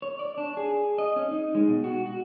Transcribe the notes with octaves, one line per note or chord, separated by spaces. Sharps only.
C#5
D5
D4
G#4
D#5
C#4
D#4
G#3
B2
F#4
F#4